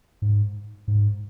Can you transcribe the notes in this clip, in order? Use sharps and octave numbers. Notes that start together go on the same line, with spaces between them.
G#2
G#2